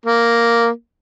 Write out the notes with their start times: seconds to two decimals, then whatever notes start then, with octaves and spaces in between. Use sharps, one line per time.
0.06 A#3